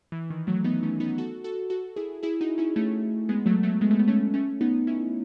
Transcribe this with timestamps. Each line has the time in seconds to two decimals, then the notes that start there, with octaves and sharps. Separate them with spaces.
0.12 E3
0.30 D#3
0.47 F#3 A3
0.64 B3 D#4
0.83 A3 C#4
1.00 B3 D#4
1.18 F#4 A4
1.44 F#4 A4
1.70 F#4 A4
1.96 E4 G#4
2.23 E4 G#4
2.41 D#4 F#4
2.58 C#4 E4
2.76 A3 C#4
3.29 G#3 B3
3.46 F#3 A3
3.63 F#3 A3
3.81 G#3 B3
3.91 A3
3.99 B3
4.08 A3 C#4
4.34 A3 C#4
4.61 B3 D#4
4.87 C#4 E4